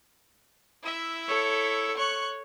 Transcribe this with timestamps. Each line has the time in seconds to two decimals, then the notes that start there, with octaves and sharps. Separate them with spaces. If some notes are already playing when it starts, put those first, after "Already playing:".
0.83 E4 E5
1.28 A4 C#5
1.97 C#5 C#6 F#6